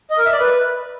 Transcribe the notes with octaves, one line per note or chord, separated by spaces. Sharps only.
D#5
A#4
E5
D5
B4